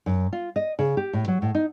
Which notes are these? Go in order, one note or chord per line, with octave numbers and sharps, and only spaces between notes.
F#2
F4
D#5
C#3
G4
A2
F#3
A2
D#4